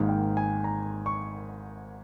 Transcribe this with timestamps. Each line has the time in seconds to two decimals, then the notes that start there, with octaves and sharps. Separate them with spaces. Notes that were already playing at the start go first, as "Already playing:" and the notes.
Already playing: G#1 G#2 D#3 A#3
0.09 G5
0.37 G#5
0.64 A#5
1.06 C#6